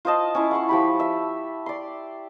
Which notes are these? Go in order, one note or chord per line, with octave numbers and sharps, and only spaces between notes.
F4 C5 D#5 A5
C#4 E4
F#5 C6 C#6
F3 G4 B5
E5
D5 C6